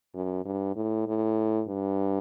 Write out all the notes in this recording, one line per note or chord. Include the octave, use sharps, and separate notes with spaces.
F#2
G2
A2
A2
G2